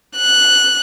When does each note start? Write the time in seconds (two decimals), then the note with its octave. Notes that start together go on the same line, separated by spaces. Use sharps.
0.17 F#6